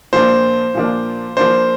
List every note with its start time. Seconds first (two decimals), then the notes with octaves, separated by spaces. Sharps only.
0.13 A#2 F3 A#3 D4 C5
0.74 A#2 F3 A#3 D4
1.37 F3 A#3 D4 C5